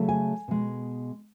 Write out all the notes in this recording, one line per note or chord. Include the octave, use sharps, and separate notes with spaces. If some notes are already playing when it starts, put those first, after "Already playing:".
Already playing: C#3 F#3 A3
G#5
B2 G#3